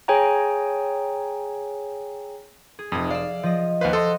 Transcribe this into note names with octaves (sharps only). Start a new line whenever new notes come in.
G#4 C#5 G5 G#5 A#5
G#4
F1 F2 D#6
D5 F5 E6
F3 D#5
D#2 B4 C5 F5 F#5
A4 D#5 C6 D#6